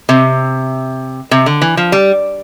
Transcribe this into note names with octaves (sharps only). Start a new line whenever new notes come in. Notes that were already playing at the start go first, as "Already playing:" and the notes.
C3
C3
D3
E3
F3
G3